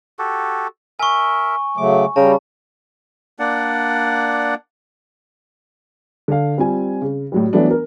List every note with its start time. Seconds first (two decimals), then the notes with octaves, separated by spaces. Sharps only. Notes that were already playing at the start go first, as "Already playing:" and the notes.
0.19 F#4 G4 A4
0.99 A#4 E5 G#5 C#6
1.77 C#3 F#3 A3 D6
2.16 C#3 G3 G5 A5 A#5
3.39 A#3 D4 D5 F#5
6.28 D3 F5
6.58 G3 C4 F4 G#5
7.02 C#3
7.32 A2 F#3 G3
7.53 E3 F#3 A3 B3 D4
7.71 A#4